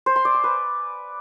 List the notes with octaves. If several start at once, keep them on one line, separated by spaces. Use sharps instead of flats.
C5
C6
D5
G#5
B4